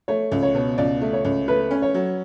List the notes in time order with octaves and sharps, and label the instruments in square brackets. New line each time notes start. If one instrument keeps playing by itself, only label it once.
[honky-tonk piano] A3 [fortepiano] C#5
[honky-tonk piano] C#2
[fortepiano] C#5
[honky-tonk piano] B2
[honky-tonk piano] C#2 [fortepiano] D5
[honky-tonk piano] A3
[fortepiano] C#5
[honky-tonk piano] C#2
[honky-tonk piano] A3 [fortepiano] B4
[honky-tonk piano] C#4
[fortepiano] C#5
[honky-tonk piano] F#3